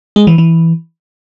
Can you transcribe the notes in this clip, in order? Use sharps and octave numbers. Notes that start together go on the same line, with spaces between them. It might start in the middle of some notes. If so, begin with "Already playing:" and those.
G#3
E3
E3